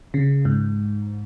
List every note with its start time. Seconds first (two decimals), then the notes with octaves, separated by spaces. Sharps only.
0.14 C#3
0.45 G#2